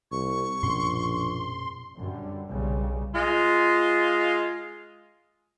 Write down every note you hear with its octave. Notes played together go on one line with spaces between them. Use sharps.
C2 C#6
A#1 F#2 B2 C#4 C6
F#2 D3 G3
B1 C#3 G3
G#3 F4